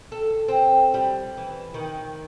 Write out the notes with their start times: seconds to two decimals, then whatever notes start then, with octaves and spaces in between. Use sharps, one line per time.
0.12 A4
0.48 C4
0.94 G3
1.37 E3
1.74 D#3